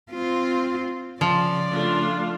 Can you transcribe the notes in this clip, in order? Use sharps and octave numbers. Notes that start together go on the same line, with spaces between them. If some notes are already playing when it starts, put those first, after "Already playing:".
C4 F4
C#3 F3 D5
A3 D4 F4